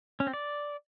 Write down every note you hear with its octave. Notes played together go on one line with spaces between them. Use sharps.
C#4
C4
D5